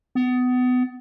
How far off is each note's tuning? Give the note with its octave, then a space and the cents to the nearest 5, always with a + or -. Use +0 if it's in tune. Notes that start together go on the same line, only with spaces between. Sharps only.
B3 +25